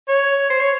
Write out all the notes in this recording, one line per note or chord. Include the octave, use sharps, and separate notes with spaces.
C#5
C5
C#5